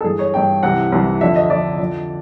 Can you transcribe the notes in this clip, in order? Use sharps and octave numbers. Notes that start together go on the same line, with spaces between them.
A4
G2 E3 G#4
C#5
G2 E3 G5
C2 C3 E3 F#5
C2 C3 E3
F2 D3 E5
D#5
F2 D3 D5
F2 D3